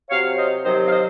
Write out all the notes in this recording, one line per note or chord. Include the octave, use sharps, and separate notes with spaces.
C3 F#3 C#5 F5
C5 D#5
C3 D#3 F#3 C5 D#5
F5
C5 D#5